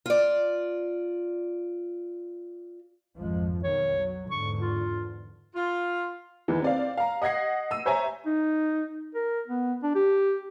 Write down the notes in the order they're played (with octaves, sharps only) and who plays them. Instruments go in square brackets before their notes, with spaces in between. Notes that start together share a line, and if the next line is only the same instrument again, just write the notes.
[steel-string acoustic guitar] F4 D5
[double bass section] G#1 F2 F3 [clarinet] G#3
[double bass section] B1 D#3 [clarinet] C#5
[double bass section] F#3
[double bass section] E2 G#2 D3 [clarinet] C#6
[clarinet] F4
[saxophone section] F4
[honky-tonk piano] E2 D#3 E3
C4 D5 F5
F5 A#5
D#5 F#5 G#6 A#6 C7
E6 D#7
C5 C#5 E5 G#5 A#5
[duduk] D#4
A#4
B3
D4
G4